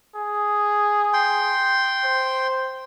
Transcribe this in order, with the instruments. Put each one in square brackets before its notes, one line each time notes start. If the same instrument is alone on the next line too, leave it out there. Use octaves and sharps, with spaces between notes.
[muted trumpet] G#4
[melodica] G5 C6
[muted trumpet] C5